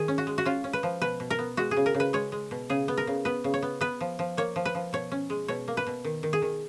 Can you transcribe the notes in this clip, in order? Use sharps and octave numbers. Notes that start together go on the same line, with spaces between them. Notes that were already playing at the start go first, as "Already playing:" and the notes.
Already playing: D#3 G#4
C#4
F#4
G#3
F#4
C#4 F4
C#4
B4
F3
B2 B4
B2
A#4
B3
G#3 F#4
G#4
C#3
A#4
C#3
B4
G#3 C#5
G#3
B2
C#3 G#4
B3
A#4
C#3
B3 B4
C#3
C#5
B3
B3 B4
F3
F3
A#3 C#5
F3
B4
F3
B2 C#5
C#4
G#3
B2 C#5
A#3
B4
B2
D#3
D#3
G#4
D#3